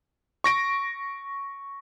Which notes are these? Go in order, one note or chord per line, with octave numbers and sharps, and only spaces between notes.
C#6 A#6 D7